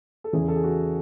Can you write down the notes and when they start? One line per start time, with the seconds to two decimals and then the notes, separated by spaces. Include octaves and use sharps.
0.24 A4
0.33 E2 C#3 E3 G#4
0.48 A4
0.56 G#4
0.64 F#4